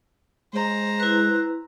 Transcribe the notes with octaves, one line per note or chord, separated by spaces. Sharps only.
G#3 C5 A#5
E4 B4 F#6